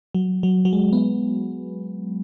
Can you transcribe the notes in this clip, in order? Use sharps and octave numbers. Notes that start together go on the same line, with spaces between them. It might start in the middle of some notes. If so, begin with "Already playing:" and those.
F#3
F#3
F#3
G#3
B3